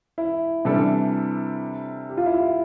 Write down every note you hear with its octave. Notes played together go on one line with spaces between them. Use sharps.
E4
C3 E3 G3 D4 A4
G4
F4
E4
F4